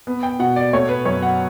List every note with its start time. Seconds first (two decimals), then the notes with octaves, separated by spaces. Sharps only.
0.07 B3
0.23 G5
0.39 B2 F#5
0.56 D5
0.73 A3 C#5
0.89 B4
1.05 F#2 C#5
1.22 F#5